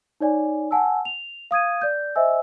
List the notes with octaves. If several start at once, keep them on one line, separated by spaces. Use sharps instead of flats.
D#4 C#5 D5 G#5
F#5 G#5 A5 E6
F7
F5 D#6 G#6 D#7
D5 G6
C5 D#5 E5 G#5 E6